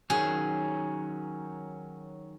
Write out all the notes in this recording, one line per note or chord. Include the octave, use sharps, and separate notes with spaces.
D#3 F#3 C#4 G#4